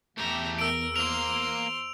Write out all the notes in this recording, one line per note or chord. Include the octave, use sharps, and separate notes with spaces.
E2 A3 G4 E5 A#5
A#4 E6 D7
A#3 A#4 C5 C6 F7